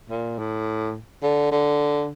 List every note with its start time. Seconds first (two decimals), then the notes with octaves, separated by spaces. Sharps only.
0.10 A#2
0.38 A2
1.23 D3
1.51 D3